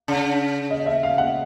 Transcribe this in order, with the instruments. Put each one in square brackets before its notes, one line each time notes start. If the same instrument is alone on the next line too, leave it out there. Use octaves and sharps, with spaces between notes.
[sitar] C#3
[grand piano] D#5
E5
F5
F#5